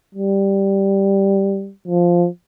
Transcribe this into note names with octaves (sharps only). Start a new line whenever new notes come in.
G3
F3